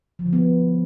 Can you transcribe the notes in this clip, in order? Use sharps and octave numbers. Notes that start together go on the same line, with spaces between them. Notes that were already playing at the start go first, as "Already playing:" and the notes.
F3
D3
B3